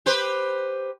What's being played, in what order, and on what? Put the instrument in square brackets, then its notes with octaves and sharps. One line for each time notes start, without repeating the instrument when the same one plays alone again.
[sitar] G4 B4 C5